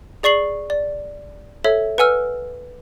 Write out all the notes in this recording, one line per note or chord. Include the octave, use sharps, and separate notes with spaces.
G#4 D5 C#6 C7 F#7
D5
A4 C#5 E5
B4 F#5 G#5 E6 F6